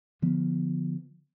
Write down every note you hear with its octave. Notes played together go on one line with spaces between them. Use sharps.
D3 F3 B3